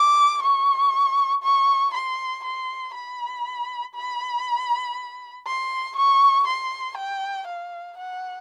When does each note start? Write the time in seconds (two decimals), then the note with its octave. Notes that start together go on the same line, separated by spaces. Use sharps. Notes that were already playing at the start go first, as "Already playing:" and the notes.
Already playing: D6
0.43 C#6
1.43 C#6
1.94 C6
2.44 C6
2.94 B5
3.95 B5
5.47 C6
5.96 C#6
6.47 C6
6.97 G5
7.47 F5
7.98 F#5